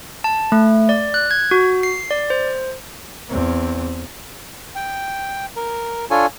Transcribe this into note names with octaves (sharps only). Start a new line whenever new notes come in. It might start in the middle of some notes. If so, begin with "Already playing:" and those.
A5
A3
D5
F#6
G#6
F#4
C7
D5
C5
E2 C4
G5
A#4
D4 F4 A4 C#5 G#5